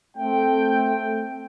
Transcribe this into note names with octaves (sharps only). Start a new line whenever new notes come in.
A3 C4 G5